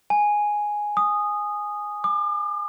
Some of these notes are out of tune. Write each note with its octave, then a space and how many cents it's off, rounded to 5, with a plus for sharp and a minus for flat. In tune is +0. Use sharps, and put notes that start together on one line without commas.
G#5 +0
D#6 -10
D6 +40